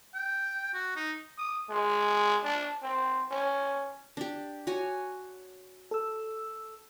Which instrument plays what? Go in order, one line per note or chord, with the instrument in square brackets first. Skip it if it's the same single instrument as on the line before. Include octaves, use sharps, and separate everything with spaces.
[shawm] G5
F#4
D#4
[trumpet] D#6
G#3
D4
C4
C#4
[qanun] D4 G4
F#4 C#5 G#5
[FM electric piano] A4 E6